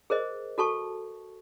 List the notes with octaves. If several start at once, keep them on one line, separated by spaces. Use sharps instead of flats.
G#4 A#4 C5 D#5
F#4 A4 A5 C#6